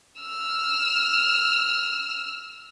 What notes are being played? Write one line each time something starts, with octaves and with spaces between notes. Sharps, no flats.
E6 F6